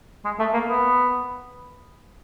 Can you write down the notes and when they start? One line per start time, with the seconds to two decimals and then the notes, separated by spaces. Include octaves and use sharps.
0.25 G#3
0.40 A3
0.54 A#3
0.68 B3